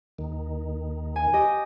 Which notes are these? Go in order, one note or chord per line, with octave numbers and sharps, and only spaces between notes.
D#2 D#3
G#5
G4 D#5